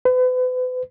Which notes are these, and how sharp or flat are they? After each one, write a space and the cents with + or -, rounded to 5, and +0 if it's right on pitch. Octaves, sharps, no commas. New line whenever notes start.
B4 +40